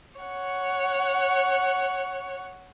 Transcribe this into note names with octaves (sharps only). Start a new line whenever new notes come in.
C#5 F#5